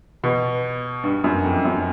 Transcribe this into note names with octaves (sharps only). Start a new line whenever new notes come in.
B2
G2
F#2
F2
F#2